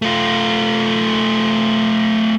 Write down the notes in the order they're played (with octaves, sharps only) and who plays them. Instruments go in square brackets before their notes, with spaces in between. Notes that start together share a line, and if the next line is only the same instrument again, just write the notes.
[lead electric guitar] A3 F4